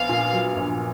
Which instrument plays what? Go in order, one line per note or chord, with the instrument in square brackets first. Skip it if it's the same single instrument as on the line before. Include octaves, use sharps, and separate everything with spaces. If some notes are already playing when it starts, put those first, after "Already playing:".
Already playing: [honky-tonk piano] A#1 B3 [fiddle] F5
[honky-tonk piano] A#2
F#3
A#1